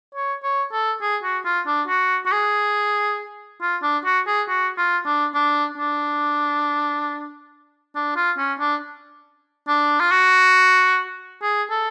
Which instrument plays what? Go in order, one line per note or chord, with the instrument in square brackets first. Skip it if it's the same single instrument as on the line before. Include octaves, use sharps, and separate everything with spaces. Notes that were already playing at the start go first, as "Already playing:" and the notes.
[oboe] C#5
C#5
A4
G#4
F#4
F4
D4
F#4
F#4
G#4
F4
D4
F#4
G#4
F#4
F4
D4
D4
D4
D4
F4
C#4
D4
D4
F4
F#4
G#4
A4